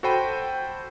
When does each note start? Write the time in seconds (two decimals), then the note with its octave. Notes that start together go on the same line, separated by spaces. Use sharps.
0.03 F#4 A4 C5 G5 B5 D#7